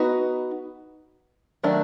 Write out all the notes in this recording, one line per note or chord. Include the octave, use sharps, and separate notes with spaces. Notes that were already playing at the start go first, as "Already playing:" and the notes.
Already playing: B3 D#4 F#4 B4
D#3 F#3 A3 D4